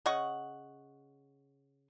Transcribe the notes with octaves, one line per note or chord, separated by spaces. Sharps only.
C#3 D#5 F#5 C#6